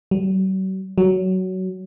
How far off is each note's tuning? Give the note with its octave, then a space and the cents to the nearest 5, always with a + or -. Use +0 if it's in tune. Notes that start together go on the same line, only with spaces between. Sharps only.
F#3 +45
F#3 +15